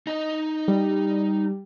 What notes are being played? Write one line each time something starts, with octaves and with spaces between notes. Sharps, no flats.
D#4 D#5
G3